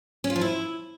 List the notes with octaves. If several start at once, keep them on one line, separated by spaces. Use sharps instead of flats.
C#4
F4
F3
E4